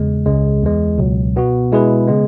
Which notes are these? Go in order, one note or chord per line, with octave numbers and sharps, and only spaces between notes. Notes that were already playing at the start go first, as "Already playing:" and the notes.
Already playing: E2 C#3 G#3
C#2 C#3 G#3
E2 E3 G#3
C#2 B2 F#3
B2 B3 F#4
B2 G#3 E4 G#4 B4
C#3 G#3 B3